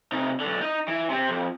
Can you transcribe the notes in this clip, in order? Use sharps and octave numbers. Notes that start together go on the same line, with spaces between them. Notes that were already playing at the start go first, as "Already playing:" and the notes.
C3 D#4
B1 D3
D#4 D#5
E3
C3 C4
F2